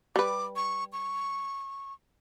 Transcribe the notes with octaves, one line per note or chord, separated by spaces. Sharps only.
G3 B4 D6
C#6
C#6